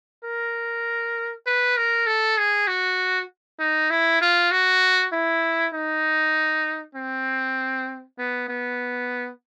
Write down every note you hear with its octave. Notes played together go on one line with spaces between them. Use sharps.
A#4
B4
A#4
A4
G#4
F#4
D#4
E4
F4
F#4
E4
D#4
C4
B3
B3